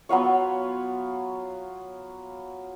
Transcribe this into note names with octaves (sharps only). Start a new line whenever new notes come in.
F#3 B3 F4 C#5